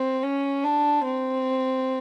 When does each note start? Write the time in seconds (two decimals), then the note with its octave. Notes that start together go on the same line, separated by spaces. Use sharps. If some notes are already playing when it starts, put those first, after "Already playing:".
Already playing: C4
0.23 C#4
0.64 D4
1.04 C4